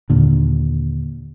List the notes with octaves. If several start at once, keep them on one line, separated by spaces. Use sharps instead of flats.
D#2 A#2 D3